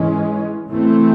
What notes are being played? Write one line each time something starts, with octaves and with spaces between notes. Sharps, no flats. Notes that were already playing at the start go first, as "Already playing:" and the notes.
Already playing: G#2 E3 G#3 C#4
A2 E3 A3 C4